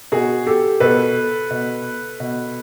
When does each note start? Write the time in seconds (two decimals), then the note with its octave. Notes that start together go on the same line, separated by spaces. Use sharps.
0.12 B2 F#4 G#4
0.47 G4 A4
0.80 B2 A4 B4
1.50 B2
2.20 B2